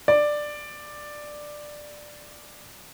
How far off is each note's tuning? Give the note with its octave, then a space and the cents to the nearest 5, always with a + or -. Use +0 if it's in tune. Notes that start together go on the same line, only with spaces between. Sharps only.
D5 +10